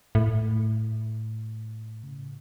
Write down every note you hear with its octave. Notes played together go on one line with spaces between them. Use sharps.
A2
C#3